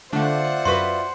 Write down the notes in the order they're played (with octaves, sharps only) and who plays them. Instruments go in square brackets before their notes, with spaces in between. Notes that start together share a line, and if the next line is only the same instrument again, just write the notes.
[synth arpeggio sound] D3 A3 D4 [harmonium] F4 D5 E5 [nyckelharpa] C5 F#5
[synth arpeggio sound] F#2 F#4 B4 [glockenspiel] C6